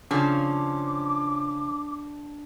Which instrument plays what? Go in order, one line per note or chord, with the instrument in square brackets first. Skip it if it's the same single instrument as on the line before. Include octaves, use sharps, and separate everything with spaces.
[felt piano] C#3 [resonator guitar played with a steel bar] F3 C#4 [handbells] D4 [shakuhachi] D6